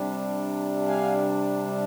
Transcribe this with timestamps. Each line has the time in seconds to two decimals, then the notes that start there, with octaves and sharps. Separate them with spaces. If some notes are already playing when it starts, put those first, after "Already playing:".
Already playing: C3 G3 D4
0.88 F5 G#5